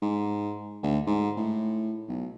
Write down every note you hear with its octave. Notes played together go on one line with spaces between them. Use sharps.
G#2
D2
G#2
A2
B1